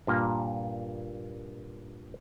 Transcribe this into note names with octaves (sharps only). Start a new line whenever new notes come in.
G2 A#2 A#3